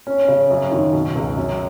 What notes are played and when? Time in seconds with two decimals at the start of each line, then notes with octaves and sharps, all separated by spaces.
0.07 C#4
0.28 C#3
0.51 F#2
0.72 D#3
0.93 B2
1.15 C#2
1.37 F#2